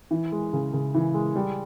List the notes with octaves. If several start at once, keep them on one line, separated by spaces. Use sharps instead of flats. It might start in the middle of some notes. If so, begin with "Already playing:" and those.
E3
G#3
C#3
C#3
E3
G#3
G3